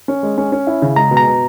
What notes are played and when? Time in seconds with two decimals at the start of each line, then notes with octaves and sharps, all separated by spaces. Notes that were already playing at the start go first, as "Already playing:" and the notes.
0.08 C#4
0.23 G#3
0.38 C#4
0.52 C#4
0.67 E4
0.82 C#3
0.96 G#3 A#5
1.11 B2
1.17 A#5
1.27 B2